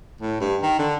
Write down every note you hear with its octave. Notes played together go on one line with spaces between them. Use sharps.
A2
G2
D#3
D3